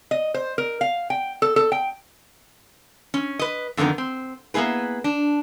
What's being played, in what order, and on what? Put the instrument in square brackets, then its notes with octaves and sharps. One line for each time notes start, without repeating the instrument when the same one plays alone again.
[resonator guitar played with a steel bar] D#5
C5
A#4
F5
G5
A4
A4
G5
C#4
B4 D#5
F2 D3 D#3 B3 A#4
C4
A#3 B3 E4 G#4 B4
D4